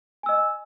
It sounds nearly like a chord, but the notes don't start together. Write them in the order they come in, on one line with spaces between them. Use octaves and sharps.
G#5 E6 D#5